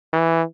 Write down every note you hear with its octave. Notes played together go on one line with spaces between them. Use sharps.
E3